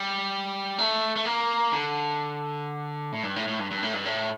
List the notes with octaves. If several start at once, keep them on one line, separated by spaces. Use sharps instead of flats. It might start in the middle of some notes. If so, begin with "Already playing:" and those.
Already playing: G3
A3
A3
A#3
D3
A2
G2
A2
A2
G2
G2
A2
G2
A2